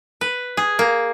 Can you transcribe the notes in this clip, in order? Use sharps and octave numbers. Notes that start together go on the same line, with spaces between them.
B4
G#4
A#3